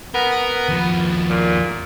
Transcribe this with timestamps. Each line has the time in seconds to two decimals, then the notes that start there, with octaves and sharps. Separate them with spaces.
0.14 B3 A#4
0.69 D#2 F3
1.30 A#2